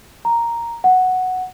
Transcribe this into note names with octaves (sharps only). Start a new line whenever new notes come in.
A#5
F#5